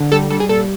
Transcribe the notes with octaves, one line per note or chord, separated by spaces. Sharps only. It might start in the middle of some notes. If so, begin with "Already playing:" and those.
Already playing: D3
G3 A4
G3 A4
G#4
A#2 A4